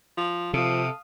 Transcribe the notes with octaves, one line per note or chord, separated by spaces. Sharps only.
F3
C3 F3 A4 F5 D#6